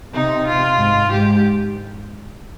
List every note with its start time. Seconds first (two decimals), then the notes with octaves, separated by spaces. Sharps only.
0.14 C3 D#4
0.47 F4
0.79 G#2
1.11 G#2 G4